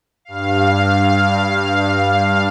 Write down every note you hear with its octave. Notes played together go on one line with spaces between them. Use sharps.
G2 F5